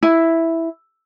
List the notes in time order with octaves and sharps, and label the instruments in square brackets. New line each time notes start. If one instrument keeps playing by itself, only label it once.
[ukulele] E4